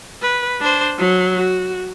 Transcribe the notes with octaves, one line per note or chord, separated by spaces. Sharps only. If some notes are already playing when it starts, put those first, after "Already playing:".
B4
D4 C5
F#3
F#4